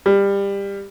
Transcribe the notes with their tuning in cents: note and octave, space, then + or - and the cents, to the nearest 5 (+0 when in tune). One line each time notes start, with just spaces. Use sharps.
G3 +20